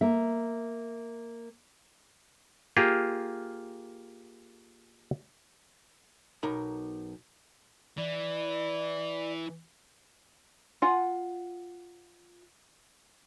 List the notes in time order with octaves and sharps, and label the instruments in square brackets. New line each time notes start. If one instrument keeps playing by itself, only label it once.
[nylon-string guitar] A#3 E5
[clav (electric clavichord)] A#3 F4 G4 G#4
[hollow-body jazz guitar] B1 D#4 A#4 B5
[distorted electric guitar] E3 [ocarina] D5
[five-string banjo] F4 F#5 G#5